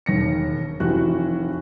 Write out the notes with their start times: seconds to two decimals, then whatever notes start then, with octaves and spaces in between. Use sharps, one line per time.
0.06 E1 D#2 A#6 C#7
0.80 F1 C2 E3 F#4 G4 F#6